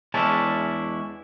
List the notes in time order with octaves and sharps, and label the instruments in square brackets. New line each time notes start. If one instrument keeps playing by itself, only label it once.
[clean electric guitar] E2 G#3 C#4 D4 E4 A5